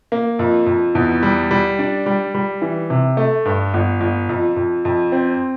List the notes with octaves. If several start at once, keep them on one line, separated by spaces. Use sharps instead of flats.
A#3
F2
F2
E2
G3
G3
D4
G3
G3
E3
C3
A3
G2
G1
G1
F2
F2
F2
C4